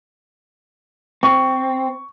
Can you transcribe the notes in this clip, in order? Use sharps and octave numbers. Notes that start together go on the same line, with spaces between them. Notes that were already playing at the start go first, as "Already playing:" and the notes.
C4 C#6